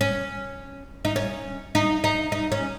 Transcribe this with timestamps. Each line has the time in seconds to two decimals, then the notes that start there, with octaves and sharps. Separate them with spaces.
0.01 C#4
1.05 D#4
1.16 C#4
1.75 D#4
2.04 D#4
2.32 D#4
2.52 C#4